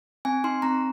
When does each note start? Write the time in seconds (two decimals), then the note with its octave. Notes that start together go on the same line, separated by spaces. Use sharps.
0.25 C4 G#5
0.44 D#4 C6
0.62 C4 A#5